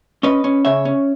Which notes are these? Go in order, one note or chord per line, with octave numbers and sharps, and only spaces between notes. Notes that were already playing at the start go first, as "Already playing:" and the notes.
C#4 B4 D#5
C#4
C#3 C#5 E5
C#4